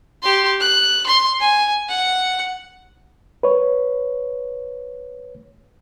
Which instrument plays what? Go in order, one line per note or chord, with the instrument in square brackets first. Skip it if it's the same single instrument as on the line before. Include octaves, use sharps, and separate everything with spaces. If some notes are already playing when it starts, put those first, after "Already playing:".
[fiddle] G4 C6
F#6
C6
G#5
F#5
[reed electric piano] B4 C#5